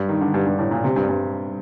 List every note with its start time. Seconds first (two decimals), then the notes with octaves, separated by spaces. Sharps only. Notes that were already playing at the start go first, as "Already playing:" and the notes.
Already playing: G2
0.09 D#3
0.21 D3
0.34 G2
0.46 G2
0.59 A2
0.71 A#2
0.84 C3
0.96 G2
1.09 G2